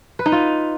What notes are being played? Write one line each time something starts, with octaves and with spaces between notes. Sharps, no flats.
B4
D#4
F4